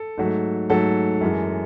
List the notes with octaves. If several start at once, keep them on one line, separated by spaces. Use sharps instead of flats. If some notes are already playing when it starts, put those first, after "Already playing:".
Already playing: A4
G#2 F#3 A3
G#2 F#3 A3 A4
F#2 E3 G#3